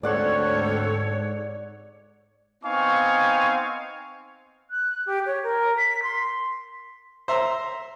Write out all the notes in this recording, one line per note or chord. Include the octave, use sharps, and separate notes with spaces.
D2 G#2 C4 A4 C#5 D5 F#5 C#6
B3 C4 D#4 F5 G#5 C#6
F#6
G4
C#5
A#4
B6
C6
C5 E5 A#5 C6 E6